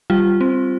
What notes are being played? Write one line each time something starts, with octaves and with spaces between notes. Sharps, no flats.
G3 F4
C4